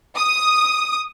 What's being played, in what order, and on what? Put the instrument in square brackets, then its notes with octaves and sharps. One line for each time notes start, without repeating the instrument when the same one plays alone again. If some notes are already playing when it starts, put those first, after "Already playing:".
[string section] D#6